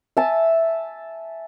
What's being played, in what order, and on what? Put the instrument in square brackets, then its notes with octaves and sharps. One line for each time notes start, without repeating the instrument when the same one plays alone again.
[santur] E5 G#5 A5